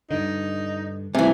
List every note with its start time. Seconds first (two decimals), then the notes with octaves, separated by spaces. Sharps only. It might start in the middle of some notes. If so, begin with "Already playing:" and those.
0.11 G2 D3 D#4
1.15 C3 E3 G3 A3 G#5